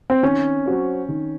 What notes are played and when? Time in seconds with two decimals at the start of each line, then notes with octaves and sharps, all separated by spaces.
0.10 C4
0.23 D#3 C#4
0.66 F#3 C4 F#4 C#5
1.09 D#3